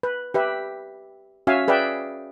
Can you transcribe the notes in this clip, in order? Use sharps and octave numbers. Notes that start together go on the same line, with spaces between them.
B4
G4 B4 E5
C#4 F#4 E5 F5 G#5
G#4 B4 D5 E5 G5